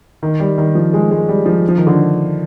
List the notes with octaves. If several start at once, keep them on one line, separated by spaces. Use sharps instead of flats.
D#3
G3
D#3
F3
G#3
G#3
G3
F3
F3
D#3
D3